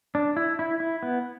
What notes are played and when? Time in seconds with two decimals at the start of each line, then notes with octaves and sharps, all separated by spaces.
0.15 D4
0.37 E4
0.59 E4
0.80 E4
1.03 B3